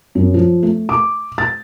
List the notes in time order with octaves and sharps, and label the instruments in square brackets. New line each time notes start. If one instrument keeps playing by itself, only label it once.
[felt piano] F#2
F3
A3
D6
A6